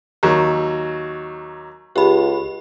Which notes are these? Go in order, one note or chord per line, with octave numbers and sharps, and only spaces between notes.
D#2 F#3
C#2 G4 B5